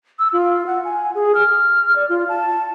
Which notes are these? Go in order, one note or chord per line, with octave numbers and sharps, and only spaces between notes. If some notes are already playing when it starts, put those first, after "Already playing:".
E6
F4
F#5
G#5
G#4
F6
D5
F4
A5